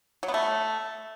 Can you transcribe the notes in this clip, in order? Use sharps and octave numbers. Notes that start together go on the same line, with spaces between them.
F#3
B3
A3